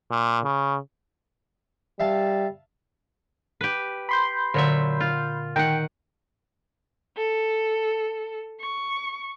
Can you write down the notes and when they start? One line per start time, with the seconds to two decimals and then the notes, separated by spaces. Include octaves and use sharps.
0.11 A#2
0.44 C#3
2.00 G3 E5 F5 A5
3.61 G4 B4
4.09 B5 C6 G6
4.54 A#2 D3 F#3 E5
5.00 F4
5.56 D#3 F#5 G5
7.17 A4
8.60 C#6